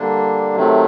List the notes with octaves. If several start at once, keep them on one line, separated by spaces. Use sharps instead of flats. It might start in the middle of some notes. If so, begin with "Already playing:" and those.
Already playing: D3 G3 A#3 D4
C3 D#3 F#3 A3